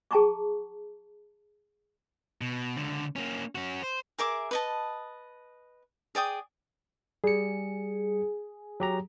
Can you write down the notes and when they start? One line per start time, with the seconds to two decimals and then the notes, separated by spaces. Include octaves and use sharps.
0.11 G#4 G5 A5 A#5 C#6 D6
2.41 B2
2.77 C#2 D3
3.16 A#3 C#4
3.55 C#4 F#4
3.83 C5
4.18 G#4 A#4 E5 D6
4.51 B4 D#5 A5
6.15 G#4 D5 G5 D#6
7.24 G3 G#4 C#7
8.80 F#3 G4 A#5